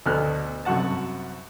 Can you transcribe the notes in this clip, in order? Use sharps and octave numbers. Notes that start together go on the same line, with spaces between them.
D2 B2 A4 F6 F#6
C2 F#2 F#4 F#5 A5